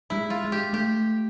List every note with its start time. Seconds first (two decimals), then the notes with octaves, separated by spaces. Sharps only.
0.10 G3 E4
0.16 G#3
0.30 F4
0.45 G#3
0.52 G4
0.73 A3 G4